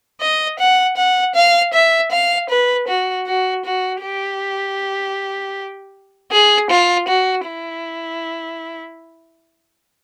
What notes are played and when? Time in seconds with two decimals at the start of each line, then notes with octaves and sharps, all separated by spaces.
0.21 D#5
0.59 F#5
0.97 F#5
1.35 F5
1.73 E5
2.11 F5
2.50 B4
2.88 F#4
3.27 F#4
3.65 F#4
4.02 G4
6.32 G#4
6.70 F4
7.08 F#4
7.46 E4